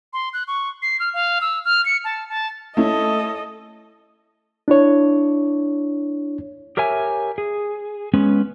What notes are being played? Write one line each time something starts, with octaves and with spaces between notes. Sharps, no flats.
C6
F#6
C#6
C7
F6
F5
E6
F6
C#7
A5
A5
A3 C#4 E4 A4 D#5
D4 E4 C#5
G4 A#4 C#5 E5 G#5
G#4
G#3 B3 C#4